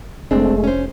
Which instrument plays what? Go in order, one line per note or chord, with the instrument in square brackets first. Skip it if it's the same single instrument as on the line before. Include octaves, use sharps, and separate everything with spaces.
[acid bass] F1 [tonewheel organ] G#3 [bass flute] A3 [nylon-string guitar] C4 D4
[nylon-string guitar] C#4 C5